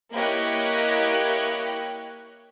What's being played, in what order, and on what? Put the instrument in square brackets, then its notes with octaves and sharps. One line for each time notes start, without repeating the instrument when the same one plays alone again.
[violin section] A#3 E4 G4 C#5 D#5 F#6